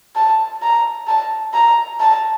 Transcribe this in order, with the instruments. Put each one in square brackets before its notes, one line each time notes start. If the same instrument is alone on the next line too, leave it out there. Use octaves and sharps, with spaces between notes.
[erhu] A5
A#5
A5
A#5
A5